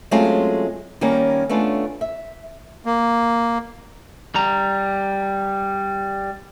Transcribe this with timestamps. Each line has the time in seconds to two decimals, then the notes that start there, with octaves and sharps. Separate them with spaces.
0.11 F#3 G#3 A3 C4 C#4 F4
1.01 D#3 G3 A#3 C#4
1.49 A3 B3 C#4 D4 F4
2.01 E5
2.86 A#3
4.35 G3 A#5